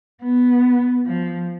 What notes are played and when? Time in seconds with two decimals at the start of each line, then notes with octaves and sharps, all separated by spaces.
0.23 B3
1.06 F3